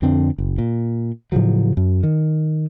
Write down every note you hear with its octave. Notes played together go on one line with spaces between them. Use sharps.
F2 D3 C4 D4
F#1
A#2
A2 C#3 F3 F#3
F#2
D#3